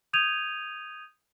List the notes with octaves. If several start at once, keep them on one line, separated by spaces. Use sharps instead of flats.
D#6 G6 G#6 D#7 F7